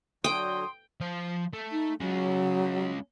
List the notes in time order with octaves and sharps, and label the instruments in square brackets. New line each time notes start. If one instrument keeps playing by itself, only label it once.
[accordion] D3 F#3 [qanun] G5 [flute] C6 [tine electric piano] D#6
[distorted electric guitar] F3 C5
A3
[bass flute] D#4
[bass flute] F#3 [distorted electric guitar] G#3 C#4